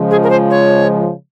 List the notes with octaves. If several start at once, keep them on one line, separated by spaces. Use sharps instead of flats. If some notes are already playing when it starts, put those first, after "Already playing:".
Already playing: C#3 F3 G#3
G#4
A#4
C5
C#5